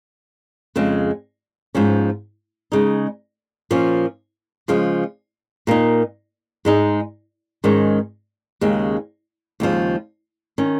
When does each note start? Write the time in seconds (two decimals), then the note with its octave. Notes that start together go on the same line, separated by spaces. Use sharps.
0.76 F2 C#3 G#3
1.75 G#2 F3 C#4
2.72 C#3 G#3 D#4
3.71 A#2 F3 C#4
4.68 C#3 F3 G#3
5.67 A#2 A#3 D#4
6.65 G#2 G#3 D#4
7.64 G#2 D#3 G#3 C#4
8.61 D#2 C#3 G#3 C#4
9.60 D#2 C#3 F3 G#3
10.58 D#3 C#4